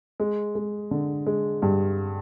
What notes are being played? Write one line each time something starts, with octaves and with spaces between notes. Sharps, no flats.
G#3
G#3
D3
G#3
G2